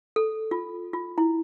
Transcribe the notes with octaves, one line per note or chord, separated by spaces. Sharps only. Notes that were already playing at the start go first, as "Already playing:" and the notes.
A4
F4
F4
E4